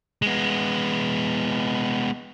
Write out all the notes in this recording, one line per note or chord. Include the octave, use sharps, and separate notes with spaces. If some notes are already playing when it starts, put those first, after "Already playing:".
G#3 B3